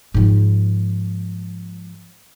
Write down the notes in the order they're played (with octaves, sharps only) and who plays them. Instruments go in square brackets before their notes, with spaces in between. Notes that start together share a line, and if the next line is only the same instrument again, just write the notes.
[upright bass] G#2 F3